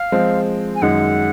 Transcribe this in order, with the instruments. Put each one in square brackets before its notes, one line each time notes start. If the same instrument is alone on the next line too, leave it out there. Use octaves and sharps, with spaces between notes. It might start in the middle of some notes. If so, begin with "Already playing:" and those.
Already playing: [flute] F5
[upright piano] F3 G#3 C4
[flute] G#5
[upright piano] F#2 D#3 G#3 [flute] F#5